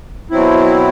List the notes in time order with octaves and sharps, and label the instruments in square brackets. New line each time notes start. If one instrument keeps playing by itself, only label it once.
[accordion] B2 F#3 C4 E4